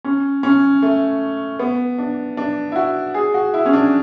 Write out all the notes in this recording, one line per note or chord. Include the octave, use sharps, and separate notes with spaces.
C#4
C#4
A3
B3
D4
D4
E4
F#4
G#4
F#4
E4
C#4
D4